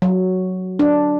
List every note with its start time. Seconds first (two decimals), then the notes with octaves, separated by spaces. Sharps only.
0.02 F#3
0.79 D4